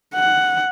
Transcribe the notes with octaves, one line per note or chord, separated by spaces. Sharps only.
F#5